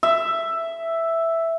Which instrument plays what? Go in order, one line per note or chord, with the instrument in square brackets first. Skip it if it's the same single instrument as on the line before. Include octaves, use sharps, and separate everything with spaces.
[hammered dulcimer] E5